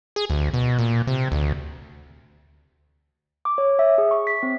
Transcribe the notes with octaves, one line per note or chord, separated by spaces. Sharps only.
G#4
D2
B2
A#2
C3
D2
D6
C#5
E5
G#4
C#6
B6
C4